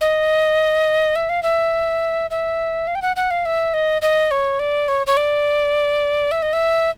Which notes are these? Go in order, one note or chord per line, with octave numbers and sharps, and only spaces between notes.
D#5
E5
F5
E5
E5
F5
G5
F#5
F#5
F5
E5
D#5
D#5
C#5
D5
C#5
C#5
D5
E5
D#5
E5